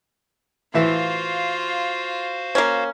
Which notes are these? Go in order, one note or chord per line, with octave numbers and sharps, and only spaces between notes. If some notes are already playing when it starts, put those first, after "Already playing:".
A2 E3 F4 F#4 C5 E5 F5
A#3 C#4